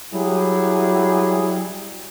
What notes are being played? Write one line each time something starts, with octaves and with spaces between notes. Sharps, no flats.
F#3 G3 E4 G#4